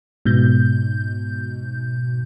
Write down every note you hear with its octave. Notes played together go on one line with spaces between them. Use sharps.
G#2 B2 G6